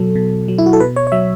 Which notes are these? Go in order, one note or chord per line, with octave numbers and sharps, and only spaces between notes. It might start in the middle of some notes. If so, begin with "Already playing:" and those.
Already playing: B2 F#3 A4
B2
F#3
E4
F#4
A4
B2 B4
C#5
C#5
F#3 E5